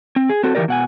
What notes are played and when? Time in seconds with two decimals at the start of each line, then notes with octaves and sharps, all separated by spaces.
0.16 C4
0.29 G#4
0.43 C4 F#4 A4
0.55 D#3 E3 G3 G4 A#4 D5
0.68 B2 F#5 G#5